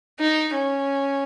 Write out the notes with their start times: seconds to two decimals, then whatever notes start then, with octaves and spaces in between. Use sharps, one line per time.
0.20 D#4
0.53 C#4